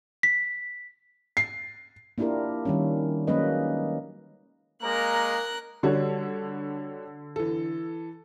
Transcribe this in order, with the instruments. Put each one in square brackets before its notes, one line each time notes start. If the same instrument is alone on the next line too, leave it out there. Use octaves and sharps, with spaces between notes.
[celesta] B6
[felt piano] C7
[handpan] A#3 D4 E4 F4 G4 A#4
D#3 G3 C#4
F#3 G#3 A#3 C#4 B4 D#5
[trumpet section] G#3 A#3 A#5 [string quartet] A#4 F#6
[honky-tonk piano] D3 [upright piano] G3 F#4 C#5
[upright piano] E3 A4